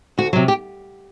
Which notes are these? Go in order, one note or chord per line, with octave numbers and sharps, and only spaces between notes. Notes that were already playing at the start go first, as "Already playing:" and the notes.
D2 F#4
C3 F#3
G4